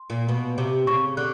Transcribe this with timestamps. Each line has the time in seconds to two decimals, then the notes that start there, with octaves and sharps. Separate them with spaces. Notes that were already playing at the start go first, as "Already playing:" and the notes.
Already playing: C6
0.10 A#2
0.29 B2
0.58 C3
0.87 C#3 C#6
1.17 D3 F#6